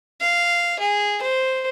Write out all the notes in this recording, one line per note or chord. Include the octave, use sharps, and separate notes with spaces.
F5
G#4
C5